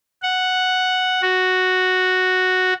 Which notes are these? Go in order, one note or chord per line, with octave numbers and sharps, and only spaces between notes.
F#5
F#4